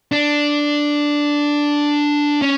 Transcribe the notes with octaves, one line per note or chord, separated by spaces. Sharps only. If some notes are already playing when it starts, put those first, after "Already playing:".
D4
C#4